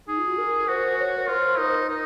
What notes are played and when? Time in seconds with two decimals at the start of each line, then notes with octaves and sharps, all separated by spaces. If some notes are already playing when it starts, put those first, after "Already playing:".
0.07 D#4 G#4
0.18 F4
0.28 F#4
0.38 A#4
0.68 F#4 C5
0.99 C#5
1.17 A#4
1.29 F4 C5
1.58 D#4 A#4
1.69 C5
1.78 A#4
1.89 D#4